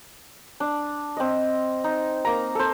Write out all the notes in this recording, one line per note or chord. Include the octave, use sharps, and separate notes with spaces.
D4
C4 D#5
D#4
A#3 A#5
A4 C5